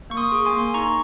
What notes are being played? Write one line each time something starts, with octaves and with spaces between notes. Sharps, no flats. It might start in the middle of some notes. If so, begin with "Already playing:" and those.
A#3 C#6
C6 D#6
G#4
G#5 C6
A#3
D#4 A#5 C#6